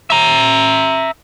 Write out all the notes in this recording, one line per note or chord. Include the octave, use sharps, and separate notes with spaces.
E5 A#5